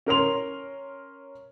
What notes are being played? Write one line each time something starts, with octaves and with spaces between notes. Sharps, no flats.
C#4 A#4 C6 F7